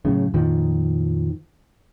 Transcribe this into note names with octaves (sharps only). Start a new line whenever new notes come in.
F#2 A2 C#3
F2 A#2 D#3 F3